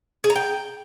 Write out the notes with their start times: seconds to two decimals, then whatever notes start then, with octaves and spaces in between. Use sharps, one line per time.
0.24 G#4
0.30 A#5
0.36 G5